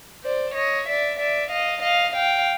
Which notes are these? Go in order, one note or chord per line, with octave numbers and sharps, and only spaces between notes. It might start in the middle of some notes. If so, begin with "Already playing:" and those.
C5 D5
C#5 D#5
D5 E5
D5 E5
D#5 F5
D#5 F5
F5 G5